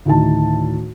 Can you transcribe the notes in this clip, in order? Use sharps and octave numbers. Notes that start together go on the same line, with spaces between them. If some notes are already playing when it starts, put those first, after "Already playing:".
D2 A2 D#3 A5